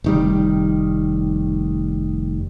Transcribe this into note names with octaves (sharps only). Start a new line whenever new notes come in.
F1 D#3 G3